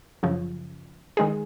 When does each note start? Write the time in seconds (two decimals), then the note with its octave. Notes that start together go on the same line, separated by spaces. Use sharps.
0.23 F#2 C#3 F3
1.17 D#3 G#3 D#4 G#4